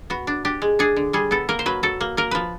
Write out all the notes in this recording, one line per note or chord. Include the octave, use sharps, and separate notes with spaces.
B3 F#4
D4
D4 G4
G#3
D4 G#4
D3
G3 G#4
B3 A4
A#3 A#4
C5
F#3 B4
F#3 A4
A#3
A#3 A#4
F3 B4